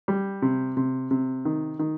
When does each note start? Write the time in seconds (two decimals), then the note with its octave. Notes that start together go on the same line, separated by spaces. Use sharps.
0.08 G3
0.42 C3
0.77 C3
1.11 C3
1.45 D#3
1.79 D#3